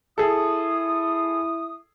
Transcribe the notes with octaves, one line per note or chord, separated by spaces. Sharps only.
E4 G#4 A4 D#6